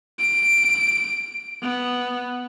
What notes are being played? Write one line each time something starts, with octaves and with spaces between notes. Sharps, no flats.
D7
B3